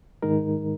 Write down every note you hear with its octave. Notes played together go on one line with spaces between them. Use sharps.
G#2 D#3 G#3 D#4 A#4